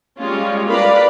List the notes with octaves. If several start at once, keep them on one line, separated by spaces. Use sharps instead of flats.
G3 G#3 C#4 F4
A#4 B4 D5 F5 A#5 B5